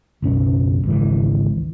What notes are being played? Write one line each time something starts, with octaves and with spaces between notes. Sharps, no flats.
F#1 B1 C#4
G#1 C#2 E3